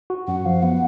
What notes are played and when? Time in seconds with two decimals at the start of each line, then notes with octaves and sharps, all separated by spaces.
0.10 F#4
0.27 F#2 F#5
0.46 F3 F5
0.63 B3 F#5